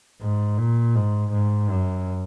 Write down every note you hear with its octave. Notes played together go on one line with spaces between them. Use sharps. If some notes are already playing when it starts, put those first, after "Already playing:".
G#2
A#2
G#2
G#2
F#2